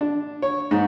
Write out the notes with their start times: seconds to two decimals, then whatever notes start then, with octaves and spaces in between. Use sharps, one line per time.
0.01 D4
0.42 C#5
0.71 G#2